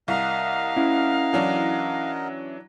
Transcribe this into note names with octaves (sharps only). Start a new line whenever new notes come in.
C2 A#4 D#5 F5 F#5
C#4 E4
E3 F#3 D4